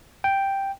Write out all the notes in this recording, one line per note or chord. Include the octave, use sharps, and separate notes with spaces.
G5